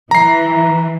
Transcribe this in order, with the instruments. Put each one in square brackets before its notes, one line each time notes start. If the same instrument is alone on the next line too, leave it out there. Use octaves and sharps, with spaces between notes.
[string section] E3 [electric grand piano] A#5 C7